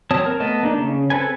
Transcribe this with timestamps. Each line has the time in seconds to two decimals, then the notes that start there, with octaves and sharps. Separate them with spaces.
0.11 F#3 C4 C#5 A5 D#6
0.26 A#4
0.40 A3 B3 D#5 A5
0.63 A#3 D4 D#4
0.78 C#3
1.10 C4 A4 B4 G#5